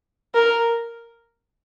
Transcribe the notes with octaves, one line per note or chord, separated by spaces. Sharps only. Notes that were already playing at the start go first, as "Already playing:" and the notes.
A#4